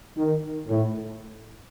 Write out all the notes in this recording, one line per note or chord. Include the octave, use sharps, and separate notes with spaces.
D#3
A2